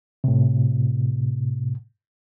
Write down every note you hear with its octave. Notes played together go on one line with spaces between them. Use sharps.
A2 C3